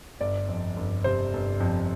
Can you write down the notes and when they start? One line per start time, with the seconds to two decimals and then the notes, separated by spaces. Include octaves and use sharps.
0.20 G1 D5
0.49 F2
0.76 G1
1.04 C3 C5
1.33 G1
1.60 F2